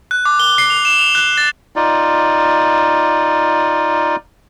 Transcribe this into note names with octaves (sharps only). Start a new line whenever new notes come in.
F#6
D6
G7
C7
F7
E7
F7
F#6
A6
D#4 F4 D5